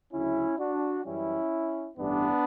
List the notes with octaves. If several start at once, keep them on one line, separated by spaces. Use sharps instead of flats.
D2 C#3 F#3 C#4 E4
D4 F#4
F#2 E3 G3 C#4 E4
A1 G2 E3 B3 D4